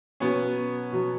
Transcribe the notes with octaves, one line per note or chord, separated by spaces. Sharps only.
B2 F#3 B3 C#4
B2 F#3